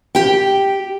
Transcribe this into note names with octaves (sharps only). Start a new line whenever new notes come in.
G4 G5